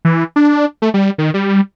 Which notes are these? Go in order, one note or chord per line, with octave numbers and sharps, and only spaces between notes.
E3
D4
A3
G3
D#3
G3